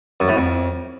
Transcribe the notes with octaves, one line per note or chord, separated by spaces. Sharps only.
F#2
A2
F2